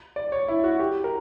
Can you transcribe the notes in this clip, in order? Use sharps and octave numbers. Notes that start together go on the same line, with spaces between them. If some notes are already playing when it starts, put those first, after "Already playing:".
D5
C#5
E4
F#4
G4
A#4